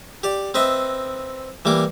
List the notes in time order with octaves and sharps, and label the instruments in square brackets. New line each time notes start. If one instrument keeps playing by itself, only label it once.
[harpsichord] G4 D5
C4 B4 D#5 E5
E3 G3 A#3 D6